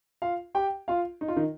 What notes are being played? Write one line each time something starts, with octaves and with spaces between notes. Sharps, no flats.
F4 F5
G4 G5
F4 F5
D#4
F4
D#3 D#4